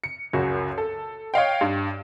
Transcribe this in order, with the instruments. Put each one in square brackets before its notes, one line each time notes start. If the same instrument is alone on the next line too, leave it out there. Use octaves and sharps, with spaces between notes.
[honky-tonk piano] C#7
C#2 F#2 F#4
A4
C#5 D#5 F5 G5
G2